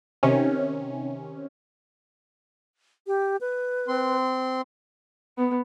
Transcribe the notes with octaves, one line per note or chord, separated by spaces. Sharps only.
C3 D#3 C#4
G4
B4
C4 C6
B3